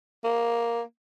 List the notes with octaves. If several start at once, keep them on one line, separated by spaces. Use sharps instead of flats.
A#3